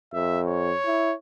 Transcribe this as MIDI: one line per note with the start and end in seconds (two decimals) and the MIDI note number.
0.13 0.73 41
0.13 0.42 76
0.47 1.15 73
0.86 1.13 64